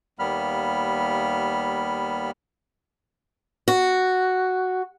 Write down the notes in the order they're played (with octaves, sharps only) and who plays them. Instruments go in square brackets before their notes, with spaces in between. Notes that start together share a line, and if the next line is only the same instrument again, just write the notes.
[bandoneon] D#2 G3 A#3 B3 B5 F6
[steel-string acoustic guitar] F#4